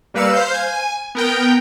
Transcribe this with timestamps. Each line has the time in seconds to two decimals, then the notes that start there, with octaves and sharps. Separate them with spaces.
0.14 G3 A#3 B4 F5 E6 C#7
0.33 C5 F5 G6
0.54 G#5
1.15 B3 A#4 G5